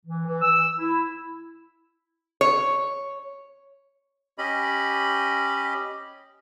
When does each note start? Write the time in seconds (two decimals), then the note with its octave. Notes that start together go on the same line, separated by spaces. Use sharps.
0.06 E3
0.26 E3
0.41 E6
0.78 E4
2.41 C#5
4.38 C#4 G4 D#5 B5